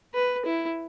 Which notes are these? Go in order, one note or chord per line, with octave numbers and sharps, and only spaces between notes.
B4
E4